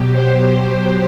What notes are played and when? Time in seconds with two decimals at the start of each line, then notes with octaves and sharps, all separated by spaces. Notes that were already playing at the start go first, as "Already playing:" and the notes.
Already playing: B2 F#3 G4
0.11 C5